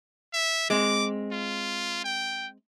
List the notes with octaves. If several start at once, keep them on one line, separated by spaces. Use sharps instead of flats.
E5
G#3 C4 D6
F4
G5